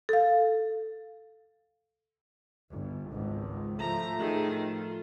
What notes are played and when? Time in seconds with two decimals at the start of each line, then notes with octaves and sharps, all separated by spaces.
0.09 A4 F5
2.71 G1
3.09 G#1 C#2 G#2
3.79 A2 F3 A3 A#5
4.19 D#3 G#4
4.71 F4